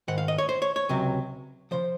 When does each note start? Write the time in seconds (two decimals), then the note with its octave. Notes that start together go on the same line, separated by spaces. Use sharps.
0.08 G#2 D#3 F#5
0.18 F5
0.28 D#5
0.38 C#5
0.49 C5
0.62 C#5
0.76 C#5
0.89 C#2 C3 F#3
1.71 C#3 F3 C5